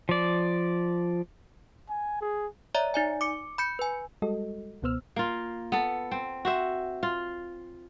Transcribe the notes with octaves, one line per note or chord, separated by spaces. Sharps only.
F3 D5
G#5
G#4
C#5 D5 E5 A#5
D#4 D5 G#5
D6 C#7
B5 G6 C#7
B4 G#5
G3 G#3 F#4 A4 D#5
C#2 B2 B3 C5 E6 F6
A#3 F4
B3 A4
C4
F#4 C5 E5
F4